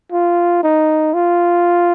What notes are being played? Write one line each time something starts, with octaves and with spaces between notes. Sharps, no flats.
F4
D#4
F4